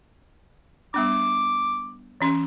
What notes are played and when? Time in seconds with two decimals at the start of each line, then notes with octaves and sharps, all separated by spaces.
0.94 G3 B3 D4 D6
2.21 E3 C#4 C6